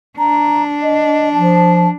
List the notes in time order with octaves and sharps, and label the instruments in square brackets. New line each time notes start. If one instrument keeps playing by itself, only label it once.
[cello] D4 [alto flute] A#5
[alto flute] D#5
[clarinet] F3 [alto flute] A5